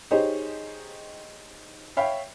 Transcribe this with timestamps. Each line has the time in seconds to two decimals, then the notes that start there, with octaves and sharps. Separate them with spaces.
0.11 D#4 G4 G#4 C5 C#5 D#5
1.97 C#5 E5 F5 G5 B5